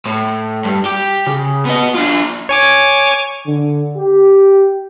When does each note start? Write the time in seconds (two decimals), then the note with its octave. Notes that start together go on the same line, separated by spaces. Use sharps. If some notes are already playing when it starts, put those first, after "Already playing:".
0.06 A2
0.65 G2
0.85 G4
1.26 C#3
1.65 B3 D#5
1.94 D4 F4
2.49 C#5 G#5 D6
3.47 D3
3.96 G4